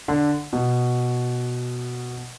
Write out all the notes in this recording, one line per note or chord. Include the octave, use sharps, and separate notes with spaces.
D3
B2